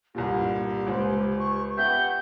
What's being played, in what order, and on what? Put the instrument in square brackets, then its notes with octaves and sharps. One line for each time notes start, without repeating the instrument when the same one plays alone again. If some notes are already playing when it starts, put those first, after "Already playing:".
[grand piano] C2 G2 A#2 [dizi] G4
[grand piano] C#2 C5
[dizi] C#6
[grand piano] B3 G4 E5 [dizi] F#5 [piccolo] G6